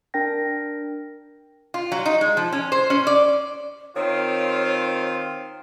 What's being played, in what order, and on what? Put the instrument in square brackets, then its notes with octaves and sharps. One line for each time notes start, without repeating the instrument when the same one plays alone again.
[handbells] D4 A#4 G5 A#6
[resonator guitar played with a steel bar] F4
F#3
D#4
G#3
F3
C#4
C5
C#4
D5
[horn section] D#3 C4 F4 [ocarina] C#5